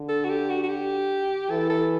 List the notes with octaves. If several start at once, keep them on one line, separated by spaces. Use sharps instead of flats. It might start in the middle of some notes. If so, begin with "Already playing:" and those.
Already playing: D3
A4
F#4
G4
F#4
F#4
G4
E3 A4
A4